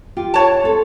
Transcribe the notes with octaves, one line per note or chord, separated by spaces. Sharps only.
F4 G4
C#5 A5
C4 A4